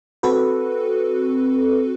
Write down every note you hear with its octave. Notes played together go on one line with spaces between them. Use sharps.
C4 F#4 A4 B4